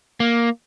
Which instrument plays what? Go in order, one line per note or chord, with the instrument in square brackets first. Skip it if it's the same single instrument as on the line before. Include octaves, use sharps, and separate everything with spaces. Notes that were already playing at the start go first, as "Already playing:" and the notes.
[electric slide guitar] A#3